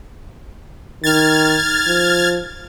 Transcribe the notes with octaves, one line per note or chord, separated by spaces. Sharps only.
D#3 F6 G#6 A6
F3